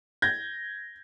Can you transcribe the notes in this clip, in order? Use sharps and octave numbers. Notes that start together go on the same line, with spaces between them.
G6 G#6 A#6